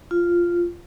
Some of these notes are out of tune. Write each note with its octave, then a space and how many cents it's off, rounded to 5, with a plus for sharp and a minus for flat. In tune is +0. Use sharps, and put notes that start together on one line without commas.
F4 -5